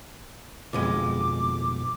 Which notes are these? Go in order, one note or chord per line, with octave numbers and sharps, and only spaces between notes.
B1 F2 G#3 D6